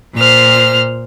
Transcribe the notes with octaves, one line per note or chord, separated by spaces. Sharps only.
A#2 C5 F6